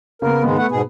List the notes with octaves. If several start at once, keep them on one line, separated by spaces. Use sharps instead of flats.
C#3 B3 A#4
G#2 D#3 G#3 B3
A3 F#5
G#2 B2 G#4